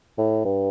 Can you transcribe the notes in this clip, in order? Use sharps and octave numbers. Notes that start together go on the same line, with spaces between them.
A2
G2